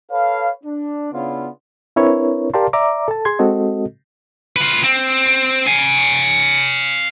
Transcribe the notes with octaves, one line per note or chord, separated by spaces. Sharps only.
A4 B4 C#5 F5
D4
C#3 B3 C#4 D4 E4 F4
C4 D4 E4 A#4 B4 C#5
G4 A#4 D5 F5 A5 C6
D5 E5 A#5 D6
A4 A5
G#4 C6 G#6
G#3 C4 F#4 A4 D#5
F4 B4
C4
F5 G#5